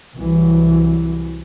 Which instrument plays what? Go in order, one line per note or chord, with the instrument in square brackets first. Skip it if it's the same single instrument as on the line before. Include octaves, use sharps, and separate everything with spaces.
[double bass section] C2 E3 F#3